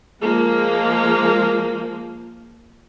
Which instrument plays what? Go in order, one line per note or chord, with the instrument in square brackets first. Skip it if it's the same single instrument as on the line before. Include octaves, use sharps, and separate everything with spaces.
[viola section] F3 G#3 A#3